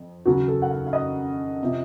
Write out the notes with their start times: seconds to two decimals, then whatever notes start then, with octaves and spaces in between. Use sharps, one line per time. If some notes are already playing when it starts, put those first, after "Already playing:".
Already playing: F2
0.25 D#2 C#3 F#3 F#4
0.48 A4
0.62 F#5
0.71 F5
0.87 F5
0.93 D#5
1.63 C3 F3